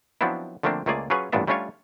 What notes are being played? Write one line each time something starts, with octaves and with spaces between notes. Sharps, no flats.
F3 F#3 B3 C4 D4 E4
D3 F3 A3 A#3 C4 D4
C#2 A3 A#3 F4 G#4 D5
F#3 C#4 F4 G#4 B4 C#5
A1 G2 A#2 B3 D4 E5
G3 A3 C#4 D4 F4 C#5